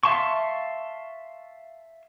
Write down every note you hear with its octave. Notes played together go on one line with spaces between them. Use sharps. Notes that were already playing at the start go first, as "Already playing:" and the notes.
E5 F5 A5 C6 C#6